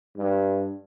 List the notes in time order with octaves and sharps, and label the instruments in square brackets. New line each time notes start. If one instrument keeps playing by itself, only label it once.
[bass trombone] G2